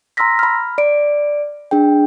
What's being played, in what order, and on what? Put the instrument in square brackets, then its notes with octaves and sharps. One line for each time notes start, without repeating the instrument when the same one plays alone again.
[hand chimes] A#5 C6 E6 F6 A#6 B6
B5 F6
D5 D7
D4 G#4 G5